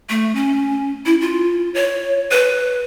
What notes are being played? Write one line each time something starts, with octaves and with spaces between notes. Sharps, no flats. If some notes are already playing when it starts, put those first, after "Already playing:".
A3
C#4
E4
F4
C#5
B4